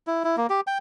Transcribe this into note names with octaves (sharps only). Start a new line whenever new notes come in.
E4
E4
A#3
G4
G5